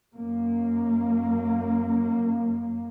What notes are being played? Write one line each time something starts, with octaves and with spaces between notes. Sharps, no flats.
F#2 A#3